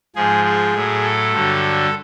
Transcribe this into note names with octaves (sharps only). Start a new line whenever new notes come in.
G#2 F3 G#4
G#4
A2 F#3
A4
G2 D3 F#3